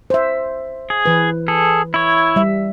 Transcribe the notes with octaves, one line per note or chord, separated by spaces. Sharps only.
C5 E5
G#4
E3 B4
G#4 A4
E4 C#5
G3 E5